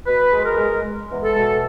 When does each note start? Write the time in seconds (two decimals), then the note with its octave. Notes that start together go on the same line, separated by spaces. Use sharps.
0.06 B2 B4
0.33 G#3
0.45 A#4
0.58 G#3
0.83 G#3
1.10 E2
1.23 A4
1.36 B2